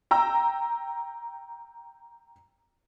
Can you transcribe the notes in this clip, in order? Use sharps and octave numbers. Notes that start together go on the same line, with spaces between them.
G5 A#5 E6